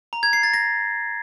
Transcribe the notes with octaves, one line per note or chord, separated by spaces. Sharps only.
A#5
G#6
C7
A6
A#6